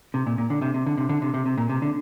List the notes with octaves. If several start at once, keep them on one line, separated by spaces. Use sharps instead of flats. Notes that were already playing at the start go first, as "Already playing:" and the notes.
C3
A#2
A#2
D3
C3
C3
D3
C3
D3
C3
C3
C3
A#2
C3
D3